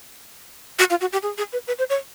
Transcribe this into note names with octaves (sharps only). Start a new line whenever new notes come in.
F#4
F4
F#4
G4
G#4
G#4
B4
B4
C5
C#5